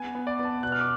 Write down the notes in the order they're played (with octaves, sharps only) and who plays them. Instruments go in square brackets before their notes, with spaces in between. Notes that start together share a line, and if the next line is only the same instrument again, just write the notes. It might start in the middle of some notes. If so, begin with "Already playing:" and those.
Already playing: [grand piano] B3 G#5
B3
D5
B3
A5
B2 F#6
F6
D6